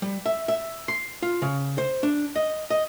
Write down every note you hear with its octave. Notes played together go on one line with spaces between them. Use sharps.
G3
E5
E5
C6
F4
C#3
C5
D4
D#5
D#5